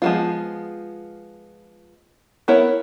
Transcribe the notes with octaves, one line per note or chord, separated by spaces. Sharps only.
F3 G#3 A3 B3 F4
B3 E4 A#4 C#5